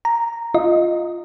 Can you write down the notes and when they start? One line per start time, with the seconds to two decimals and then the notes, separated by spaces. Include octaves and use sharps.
0.05 A#5
0.54 F4 D#5